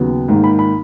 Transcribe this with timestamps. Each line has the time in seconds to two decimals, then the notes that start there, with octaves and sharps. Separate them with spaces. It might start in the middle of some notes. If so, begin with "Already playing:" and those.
Already playing: D#2 C#3 F#3 B3
0.28 G#2 D#3 A#3
0.44 B5
0.59 B5